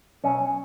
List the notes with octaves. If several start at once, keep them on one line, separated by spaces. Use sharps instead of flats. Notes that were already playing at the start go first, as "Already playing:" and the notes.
B1 C#4